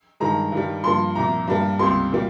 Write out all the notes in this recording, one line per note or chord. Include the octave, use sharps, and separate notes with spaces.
G2 D#3 G#3 A#5
G2 D#3 G3
G2 F3 A#3 C6
C2 A#2 F3 A#5
G2 G3 A#3
C#2 C3 G3 A#3 C6
A#2 G3 A#3